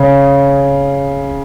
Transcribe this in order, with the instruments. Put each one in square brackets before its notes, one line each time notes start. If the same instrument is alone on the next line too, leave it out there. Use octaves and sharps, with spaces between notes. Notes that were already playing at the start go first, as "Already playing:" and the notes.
Already playing: [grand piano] C#3